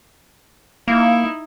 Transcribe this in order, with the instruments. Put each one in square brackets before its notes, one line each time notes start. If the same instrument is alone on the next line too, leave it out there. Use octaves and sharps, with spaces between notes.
[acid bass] A#3 [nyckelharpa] D#4 E4